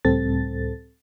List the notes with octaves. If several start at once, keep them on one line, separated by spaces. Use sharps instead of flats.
C#2 A2 G3 C4 A4 A6